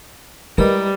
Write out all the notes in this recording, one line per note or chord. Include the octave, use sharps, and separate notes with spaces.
G3 G#3 E4 A#4 B4 D#5